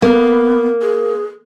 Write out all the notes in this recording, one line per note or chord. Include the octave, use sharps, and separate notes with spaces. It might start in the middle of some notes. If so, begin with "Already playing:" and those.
A#3 B3
G#4